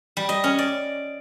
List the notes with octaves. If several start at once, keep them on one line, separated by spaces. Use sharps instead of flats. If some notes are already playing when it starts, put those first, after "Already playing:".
G3
D#5
C#4
D5